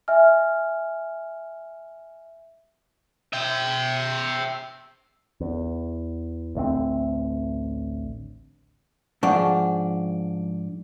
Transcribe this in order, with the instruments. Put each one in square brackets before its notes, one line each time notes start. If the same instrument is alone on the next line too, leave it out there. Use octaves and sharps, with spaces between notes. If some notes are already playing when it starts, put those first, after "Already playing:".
[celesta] D#5 E5 G#5 F6
[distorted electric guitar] E5 G5
[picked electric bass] E2
A1 D2 A3 C4
[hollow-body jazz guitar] G#2 F3 D4 [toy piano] F#5 C#6